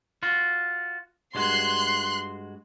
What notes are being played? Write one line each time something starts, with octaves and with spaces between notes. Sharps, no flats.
F4 F#4
G2 G#3 F#4 C6 F#6